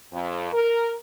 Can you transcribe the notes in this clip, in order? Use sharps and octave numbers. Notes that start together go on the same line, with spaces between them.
F2
A#4